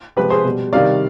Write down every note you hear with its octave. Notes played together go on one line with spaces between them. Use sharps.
C3 F3 G#3 G4 B4
G#4 C5
B2 G3
C3 D#3 G3 D5 F5